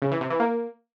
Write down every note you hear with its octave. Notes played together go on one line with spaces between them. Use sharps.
C#3
E3
C3
E3
A#3